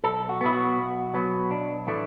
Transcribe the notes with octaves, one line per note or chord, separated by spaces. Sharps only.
B1 A4
F#4
B2 F#3 B3 E4
F#4
B1
B2 F#3 B3
B1 D4
A2 E3 A3 D4